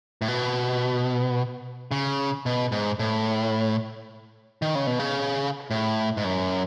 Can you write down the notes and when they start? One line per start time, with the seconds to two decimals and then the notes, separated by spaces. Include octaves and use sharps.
0.22 A2
0.28 B2
1.91 C#3
2.46 B2
2.72 G#2
2.99 A2
4.62 D#3
4.75 C#3
4.87 B2
4.99 C#3
5.71 A2
6.17 G#2
6.24 F#2